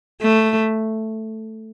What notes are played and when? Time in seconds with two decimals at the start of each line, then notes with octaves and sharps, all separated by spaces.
0.22 A3